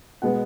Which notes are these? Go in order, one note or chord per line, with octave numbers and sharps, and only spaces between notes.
B2 G#3 B3 F#5